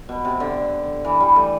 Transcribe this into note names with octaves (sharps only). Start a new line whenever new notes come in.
B2
C3
D3
E3
G3
A3